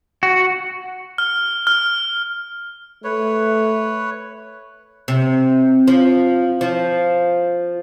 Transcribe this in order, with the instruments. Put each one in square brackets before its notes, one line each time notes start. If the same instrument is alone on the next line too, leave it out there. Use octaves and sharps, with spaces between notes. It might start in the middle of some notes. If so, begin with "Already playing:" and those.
[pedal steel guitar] F#4
[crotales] F6
F6
[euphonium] A3 [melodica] B4 C#5
[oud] C3
F3
F3